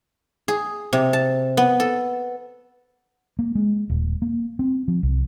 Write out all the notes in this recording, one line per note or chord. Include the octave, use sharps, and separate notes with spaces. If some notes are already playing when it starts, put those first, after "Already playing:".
G#4
C3
A5
B3
A4
A#3
G#3
D#1
A#3
C4
F3
C2